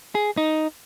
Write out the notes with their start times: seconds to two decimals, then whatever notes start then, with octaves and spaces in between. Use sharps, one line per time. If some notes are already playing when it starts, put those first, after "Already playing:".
0.15 G#4
0.37 D#4